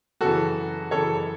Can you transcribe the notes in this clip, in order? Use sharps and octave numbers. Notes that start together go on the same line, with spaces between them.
F#2 C#3 E3 F#4 A4
F#2 C#3 E3 A4 C#5